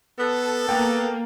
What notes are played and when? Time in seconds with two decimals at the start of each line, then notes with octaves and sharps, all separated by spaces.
0.19 B3 A4
0.69 A#3 B3 G5 A6